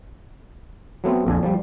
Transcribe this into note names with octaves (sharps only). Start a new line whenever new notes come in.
F#3 A3 B3 C4
A#1 F2 D4 G#5
F3 G3